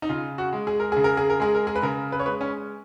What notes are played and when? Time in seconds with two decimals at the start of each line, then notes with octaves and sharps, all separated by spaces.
0.02 D#4
0.09 C#3 F4
0.38 F#4
0.53 G#3
0.67 G#4
0.80 A#4
0.92 C#3 G#4
1.04 A#4
1.17 G#4
1.30 A#4
1.40 G#3 G#4
1.54 A#4
1.67 G#4
1.76 B4
1.82 C#3 A#4
2.12 B4
2.20 C#5
2.26 G#3 B4
2.41 C#4